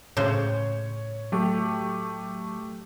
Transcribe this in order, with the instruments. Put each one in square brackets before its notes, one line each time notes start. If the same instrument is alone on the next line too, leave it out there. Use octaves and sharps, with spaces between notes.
[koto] A2 C#3 C5 [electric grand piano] C#5
[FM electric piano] F#3 C#6 [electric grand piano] A3 G4